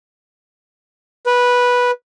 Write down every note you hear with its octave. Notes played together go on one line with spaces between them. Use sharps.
B4